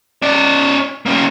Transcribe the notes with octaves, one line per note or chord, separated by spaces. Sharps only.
C#4 D5
A#3 C#4